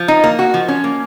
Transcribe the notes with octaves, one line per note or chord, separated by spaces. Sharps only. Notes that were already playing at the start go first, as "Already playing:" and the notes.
Already playing: F3
D#4
A#3
F#4
F3
C#4
A#3